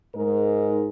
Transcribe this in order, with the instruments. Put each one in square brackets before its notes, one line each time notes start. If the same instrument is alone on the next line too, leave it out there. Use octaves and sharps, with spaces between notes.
[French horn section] G#2 G#3 D#4 G#4 A#4